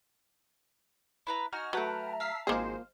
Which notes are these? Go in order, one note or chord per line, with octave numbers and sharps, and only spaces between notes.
E4 B4 A#5
D#4 F#4 G#5 F6
F#3 A3 B4 E5 F#5 G5 A5 A#5
F5 E6 B6 C7
G#1 F3 G#3 A#3 G#4 C5